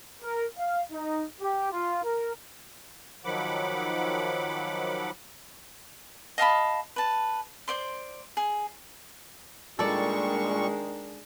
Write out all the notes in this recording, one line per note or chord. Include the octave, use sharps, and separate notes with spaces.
A#4
F5
D#4
G4
F4
A#4
D#3 F3 F#3 F#5 B5 D6
D#5 F5 A5 B5
B4 A5
C5 D5 C6
G#4
A#2 D#3 G3 G#3 D4 A4 D5 C#6